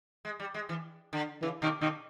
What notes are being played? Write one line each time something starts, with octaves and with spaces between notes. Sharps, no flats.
G#3
G3
G#3
E3
D3
C#3 E3
B2 D#3
B2 D#3